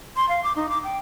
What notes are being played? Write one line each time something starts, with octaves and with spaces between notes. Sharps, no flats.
C6
F5
D6
D#4
D6
G5